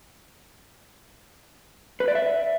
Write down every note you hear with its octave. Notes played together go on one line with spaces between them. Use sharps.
B4
D5
E5